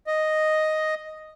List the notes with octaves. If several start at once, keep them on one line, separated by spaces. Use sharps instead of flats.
D#5